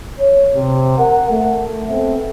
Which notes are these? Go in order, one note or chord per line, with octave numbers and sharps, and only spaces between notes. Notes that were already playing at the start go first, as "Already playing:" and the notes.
C#5
C3
A#4 F#5
A3
B3 C4 A4 E5